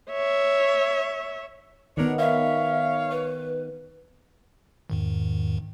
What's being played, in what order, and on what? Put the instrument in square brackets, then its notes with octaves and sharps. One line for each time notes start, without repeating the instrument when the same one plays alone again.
[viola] C#5 E5
[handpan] D#3 B3 [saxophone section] D4 A#4 C#5
[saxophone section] C#5 F5 [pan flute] E5
[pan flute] B4
[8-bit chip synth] E2 G#2 D#3